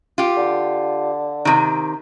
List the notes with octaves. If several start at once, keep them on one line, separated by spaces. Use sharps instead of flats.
F4 G4
D3
C3 D#3